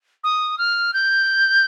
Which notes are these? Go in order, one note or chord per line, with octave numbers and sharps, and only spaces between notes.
D#6
F6
G6